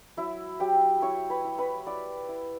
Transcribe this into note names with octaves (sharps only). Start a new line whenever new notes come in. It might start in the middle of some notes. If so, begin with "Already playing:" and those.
F#3 E4 E5
F#3 G4 G5
E4 C#5 C#6
B4 B5
E4
B4 B5
E4 D5 D6
E4